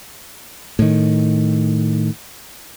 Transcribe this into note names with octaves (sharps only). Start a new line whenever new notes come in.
A2 D#3